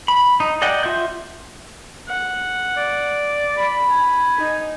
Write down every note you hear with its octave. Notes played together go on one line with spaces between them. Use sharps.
B5
D#4
D5 D#5 F#5 G5
F4 E5 F#5 G6
F#5
D5
B5
G#5
D#4